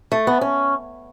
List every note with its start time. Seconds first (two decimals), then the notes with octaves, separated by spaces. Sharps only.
0.12 A3
0.27 B3
0.41 C#4